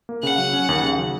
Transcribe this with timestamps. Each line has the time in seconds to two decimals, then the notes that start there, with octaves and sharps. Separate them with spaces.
0.09 A#3
0.23 C#3 F#5
0.38 F#3
0.53 C#4
0.69 D#2
0.83 C#3
0.98 F#3